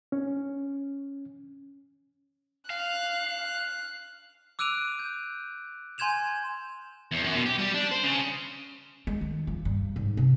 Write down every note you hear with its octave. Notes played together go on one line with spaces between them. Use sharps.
C#4
F5 F#6
D6 E6 F#6 D7 D#7 F7
G6
G#5 C6 G6 G#6 E7 F7
E2
F#2
B2
G4
G3
D4
C5
C#3
G#3
D#3
F3
G2
G#2
C3